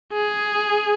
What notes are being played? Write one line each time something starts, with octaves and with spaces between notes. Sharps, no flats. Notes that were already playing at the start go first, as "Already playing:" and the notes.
G#4